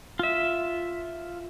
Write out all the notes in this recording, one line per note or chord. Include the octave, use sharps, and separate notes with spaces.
F4 E5